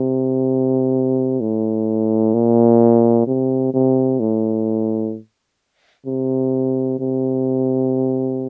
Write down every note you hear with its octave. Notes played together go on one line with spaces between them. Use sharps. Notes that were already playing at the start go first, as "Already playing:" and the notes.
Already playing: C3
A2
A#2
C3
C3
A2
C3
C3